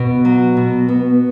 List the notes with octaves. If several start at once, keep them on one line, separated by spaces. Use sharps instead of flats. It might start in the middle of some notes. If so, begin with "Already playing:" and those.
Already playing: B2
F#3
B2
B3